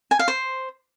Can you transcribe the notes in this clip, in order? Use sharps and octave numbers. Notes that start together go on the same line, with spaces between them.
G#5
F5
C5